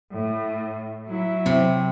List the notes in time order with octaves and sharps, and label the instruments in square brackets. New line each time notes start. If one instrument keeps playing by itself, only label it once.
[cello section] A2
F#3 E4
[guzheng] C3 [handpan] C4